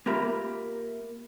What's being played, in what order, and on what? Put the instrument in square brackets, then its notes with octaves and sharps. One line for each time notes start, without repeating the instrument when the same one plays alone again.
[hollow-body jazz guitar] A#3 F4 G4 A#4 E5 B5